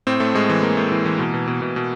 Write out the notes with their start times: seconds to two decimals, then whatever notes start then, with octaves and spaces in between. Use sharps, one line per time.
0.07 A2 C4
0.20 A2 A3
0.35 A2 G#3
0.49 E3
0.63 E3 A#3
0.77 A2
0.92 E3
1.06 E3
1.19 B2
1.34 B2
1.47 B2
1.62 B2
1.76 B2